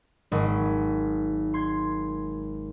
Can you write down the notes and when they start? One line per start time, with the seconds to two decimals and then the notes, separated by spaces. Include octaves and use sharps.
0.32 G#1 F#3 D#5 C#6
1.54 C6 G#6